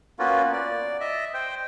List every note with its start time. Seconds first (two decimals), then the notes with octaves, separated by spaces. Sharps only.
0.19 A#3 B3 C#4 F4 F#4
0.53 D5
1.01 D#5 E5
1.34 C5 G5